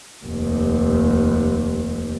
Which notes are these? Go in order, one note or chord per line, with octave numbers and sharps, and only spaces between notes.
F1 D#2